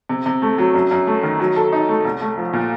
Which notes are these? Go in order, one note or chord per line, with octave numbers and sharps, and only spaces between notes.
C3
C3
A3
F#3
F#2
F#2
A3
D#3
F#3
A4
D#4
A3
C2
A3
F3
A#2